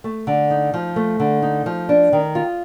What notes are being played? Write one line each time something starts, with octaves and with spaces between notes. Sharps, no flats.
A3
D3
D#4
F3
A3
D3
D#4
F3
D4
D#3
F4